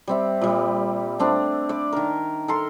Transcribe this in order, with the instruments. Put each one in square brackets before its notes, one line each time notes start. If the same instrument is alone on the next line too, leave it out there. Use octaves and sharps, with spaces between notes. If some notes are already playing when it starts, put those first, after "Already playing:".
[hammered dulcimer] G3 C4 E5
A#2 G3
A3 C4 D4
D5 B5
D#3 A#4
A4 A#4 C6